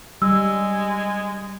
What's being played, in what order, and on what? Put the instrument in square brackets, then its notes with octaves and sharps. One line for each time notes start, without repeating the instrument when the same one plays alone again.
[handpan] G3 [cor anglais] G#3 [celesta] E6